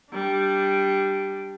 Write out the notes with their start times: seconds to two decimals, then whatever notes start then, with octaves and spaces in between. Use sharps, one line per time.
0.12 G3 D4